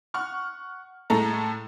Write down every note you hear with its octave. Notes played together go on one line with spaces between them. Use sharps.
F#5 C#6 F6
A2 G#3 A3 A4 A#5